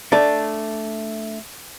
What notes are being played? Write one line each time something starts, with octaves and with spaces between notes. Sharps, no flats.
A3 D4